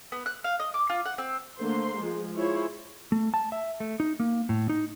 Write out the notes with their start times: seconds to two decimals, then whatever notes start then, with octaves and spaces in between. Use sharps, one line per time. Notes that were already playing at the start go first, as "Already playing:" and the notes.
0.12 B3
0.26 F#6
0.44 F5
0.60 D#5
0.74 D6
0.90 F4
1.06 F#5
1.18 C4
1.61 D3 A3 A#3 C5 C6
1.97 F3 G#3
2.36 E4 F4 G#4 C5 C#5
3.12 A3
3.34 A5
3.52 E5
3.80 A3
4.00 D#4
4.20 A#3
4.49 A2
4.69 D#4